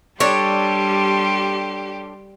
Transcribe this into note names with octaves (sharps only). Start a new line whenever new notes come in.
G3 D4 G4 A4 C#5 C6